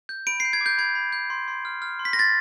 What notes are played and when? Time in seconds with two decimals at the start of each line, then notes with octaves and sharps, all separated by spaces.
0.09 G6
0.27 B5 D7
0.40 C7
0.45 G6
0.53 G#6
0.61 D6
0.66 G6
0.78 B5 G#6
0.95 B5
1.12 G6
1.30 C6
1.48 C6
1.65 F6
1.82 F6
1.99 C6
2.05 B6
2.13 A#6
2.16 C6 A6